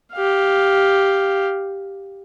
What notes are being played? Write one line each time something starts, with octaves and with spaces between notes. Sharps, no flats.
G4 F5